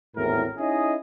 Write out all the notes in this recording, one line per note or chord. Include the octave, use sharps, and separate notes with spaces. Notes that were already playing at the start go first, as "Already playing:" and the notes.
G#1 E2 A2 A#4
C#4 D#4 E4 G#4 D#5